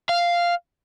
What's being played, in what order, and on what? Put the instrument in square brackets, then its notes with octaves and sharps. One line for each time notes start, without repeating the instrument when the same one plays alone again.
[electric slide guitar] F5